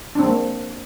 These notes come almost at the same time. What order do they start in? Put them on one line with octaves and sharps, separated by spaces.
D4 C4 G#3 A#3